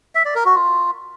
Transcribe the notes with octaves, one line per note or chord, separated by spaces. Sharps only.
E5
D5
A#4
F#4
F4